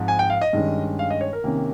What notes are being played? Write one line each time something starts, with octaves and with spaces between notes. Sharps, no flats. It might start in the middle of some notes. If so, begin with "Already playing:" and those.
Already playing: G#2 F3 C4
G#5
G5
F5
D#5
G2 D#3 G#3 C#4
F5
D#5
C#5
A#4
C3 D#3 A#3 C#4